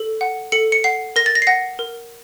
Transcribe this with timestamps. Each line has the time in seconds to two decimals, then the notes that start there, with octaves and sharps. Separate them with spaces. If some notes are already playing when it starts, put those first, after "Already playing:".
Already playing: A4
0.21 F#5
0.52 A4 C#7
0.72 C#7
0.84 F#5 C7
1.16 A#4 A#6
1.26 A6
1.35 A#6
1.42 C7
1.47 F#5 A#6
1.79 A#4